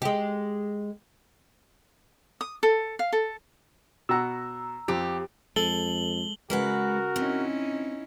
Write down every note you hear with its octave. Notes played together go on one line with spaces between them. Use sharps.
G#3 G4
D#6
A4
F5
A4
B2 F#5 A#5 E6
F2 G4
F2 G#3 A4 F#7 G7
C#3 G#3 F#4 A#4 B4 F#5
C4 C#4 D#4 E4